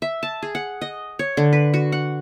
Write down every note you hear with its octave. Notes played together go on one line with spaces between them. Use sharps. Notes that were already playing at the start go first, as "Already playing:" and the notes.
E5
A5
G#4
F#5
D#5
C#5
D3
B4
F#4
F#5